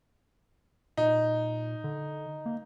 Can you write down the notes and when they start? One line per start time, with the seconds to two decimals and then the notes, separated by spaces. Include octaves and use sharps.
0.97 A#2 D#4
1.84 D3
2.46 A#3